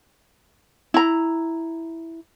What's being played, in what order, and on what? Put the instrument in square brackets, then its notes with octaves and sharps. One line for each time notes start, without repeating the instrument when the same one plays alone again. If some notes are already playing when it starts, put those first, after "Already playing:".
[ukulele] E4 A#5